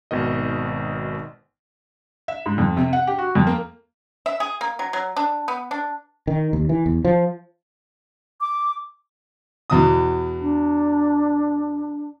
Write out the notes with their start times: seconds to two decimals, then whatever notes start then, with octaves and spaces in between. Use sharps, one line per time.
0.11 G#1 B2 D#3 D#5
2.28 E5
2.46 G#2
2.58 F2
2.77 C3
2.93 F#5
3.07 G4
3.18 F#4
3.35 F2
3.47 A#3
4.26 E5
4.40 G#4
4.61 A#3
4.79 F#3
4.93 F#3
5.16 D4
5.48 B3
5.71 D4
6.27 D#3
6.53 D#2
6.69 E3
6.86 E2
7.05 F3
8.41 D6
9.70 E2 B2 D#6
10.41 D4